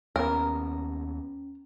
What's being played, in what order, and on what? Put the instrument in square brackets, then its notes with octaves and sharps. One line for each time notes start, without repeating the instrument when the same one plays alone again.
[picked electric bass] D#2 B3 [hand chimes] C#4 [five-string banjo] A#4